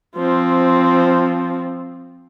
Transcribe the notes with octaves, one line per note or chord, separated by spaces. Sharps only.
F3 C4